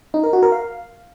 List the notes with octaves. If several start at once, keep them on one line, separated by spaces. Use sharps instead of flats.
D#4
A#4
F#4
A#4
F5